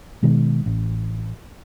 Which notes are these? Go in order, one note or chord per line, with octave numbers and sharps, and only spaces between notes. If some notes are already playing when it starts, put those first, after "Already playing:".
B2 D#3 G#3
A1